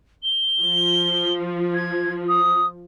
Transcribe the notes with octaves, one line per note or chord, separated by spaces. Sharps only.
G7
F3
G#6
D#6